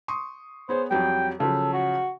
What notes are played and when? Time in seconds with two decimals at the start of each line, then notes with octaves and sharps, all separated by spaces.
0.08 C6 C#6 D#6
0.69 B3 G#4 C5 C#5
0.91 F2 F#3 G3 G5
1.40 C#3 F3 F#3 A4
1.73 F#4